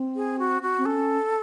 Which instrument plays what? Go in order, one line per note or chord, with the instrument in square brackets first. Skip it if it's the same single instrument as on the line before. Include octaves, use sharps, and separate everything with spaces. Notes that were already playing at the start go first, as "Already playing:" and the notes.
Already playing: [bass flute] C4
[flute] G#4
F#4
F#4
[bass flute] C4
[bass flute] C#4 [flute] A4